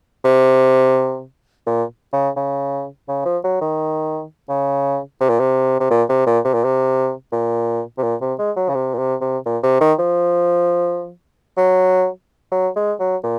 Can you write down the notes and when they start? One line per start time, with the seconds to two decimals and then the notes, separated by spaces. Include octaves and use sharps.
0.25 C3
1.67 A#2
2.13 C#3
2.36 C#3
3.09 C#3
3.25 F3
3.44 F#3
3.61 D#3
4.49 C#3
5.21 C3
5.29 A#2
5.40 C3
5.80 C3
5.91 A#2
6.09 C3
6.27 A#2
6.45 C3
6.54 A#2
6.65 C3
7.32 A#2
7.98 C3
8.03 A#2
8.21 C3
8.39 G#3
8.56 F#3
8.69 C#3
8.75 C3
8.94 A#2
8.99 C3
9.21 C3
9.46 A#2
9.63 C3
9.81 D#3
9.99 F3
11.57 F#3
12.52 F#3
12.76 G#3
13.00 F#3
13.24 A#2